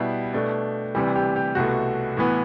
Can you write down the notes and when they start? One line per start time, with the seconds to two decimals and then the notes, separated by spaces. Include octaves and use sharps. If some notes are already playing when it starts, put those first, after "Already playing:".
Already playing: B2 G3 B3 E4 G4
0.33 B2 A3 D4
0.95 D2 C3 E3 G3
1.16 G4
1.36 G4
1.55 C2 B2 A3 F#4
2.17 A2 E3 B3